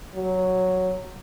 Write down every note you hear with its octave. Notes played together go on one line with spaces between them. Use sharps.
F#3